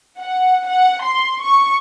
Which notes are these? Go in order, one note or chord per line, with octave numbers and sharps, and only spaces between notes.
F#5
F#5
C6
C#6